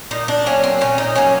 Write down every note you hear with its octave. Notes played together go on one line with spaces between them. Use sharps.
A#2 D#4
D4
F#3 A#3 C#4
C4
A#2 C#4
D#4
F#3 A#3 C#4